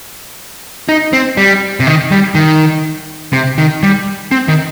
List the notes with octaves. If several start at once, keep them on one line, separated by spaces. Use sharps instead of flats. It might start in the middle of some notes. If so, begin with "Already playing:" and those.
D#4
C4
G3
C3
D#3
G3
D#3
C3
D#3
G3
C4
D#3